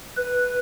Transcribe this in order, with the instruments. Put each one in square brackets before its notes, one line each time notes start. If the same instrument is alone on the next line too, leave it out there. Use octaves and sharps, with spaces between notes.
[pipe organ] B4